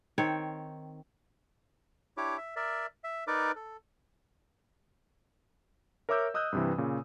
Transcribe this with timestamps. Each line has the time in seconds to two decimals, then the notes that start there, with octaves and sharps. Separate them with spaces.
0.18 D#3 C4 C#5 G5
2.17 D4 E4 G4 C#5 D6
2.38 E5
2.56 A#4 D5 E5
3.04 E5
3.27 D#4 A#4 B4 D5 D6
3.56 A4
6.09 A#4 C#5 E5 D6 E6 G6
6.34 D#5 D#6 E6 F#6 G6
6.53 G2 C3 E3
6.78 A#2 C#3